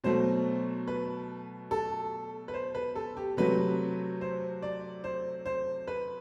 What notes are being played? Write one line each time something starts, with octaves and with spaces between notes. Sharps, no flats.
B2 F#3 A3 C5
B4
A4
B4
C5
B4
A4
G4
C3 F#3 A3 B4
C5
D5
C5
C5
B4